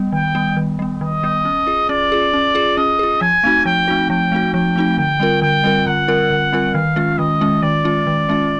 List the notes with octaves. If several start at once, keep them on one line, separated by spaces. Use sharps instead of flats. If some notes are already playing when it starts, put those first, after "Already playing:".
Already playing: G3 B3
D#3 G5
G3 B3
D#3
G3 B3
D#3 D#5
G3 B3
C#4
F4 G#4
C#4 D5
F4 G#4
C#4
F4 G#4
C#4 D#5
F4 G#4
F3 G#5
A3 C4 D#4 F#4
F3 G5
A3 C4 D#4 F#4
F3 G5
A3 C4 D#4 F#4
F3 G5
A3 C4 D#4 F#4
D3 G5
G3 C4 F4 A#4
D3 G5
G3 C4 F4 A#4
D3 F#5
G3 C4 F4 A#4
D3
G3 C4 F4 A#4
D#3 F5
G#3 C#4 F4
D#3 D#5
G#3 C#4 F4
D#3 D5
G#3 C#4 F4
D#3
G#3 C#4 F4